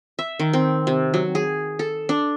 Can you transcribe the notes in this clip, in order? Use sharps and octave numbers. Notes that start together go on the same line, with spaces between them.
E5
D#3
C4
C3
F#3
G#4
A4
D4